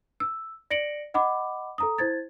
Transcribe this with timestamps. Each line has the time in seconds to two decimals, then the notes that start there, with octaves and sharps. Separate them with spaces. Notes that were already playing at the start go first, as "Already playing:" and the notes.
0.20 E6
0.70 D5 A#6 C#7 D7 F#7
1.14 D#5 F#5 B5 D6
1.78 A4 A#5 D#6
1.98 E4 C5 G#6 A6